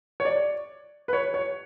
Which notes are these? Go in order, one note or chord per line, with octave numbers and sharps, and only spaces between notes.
C#5
D5
B4
C#5
C#5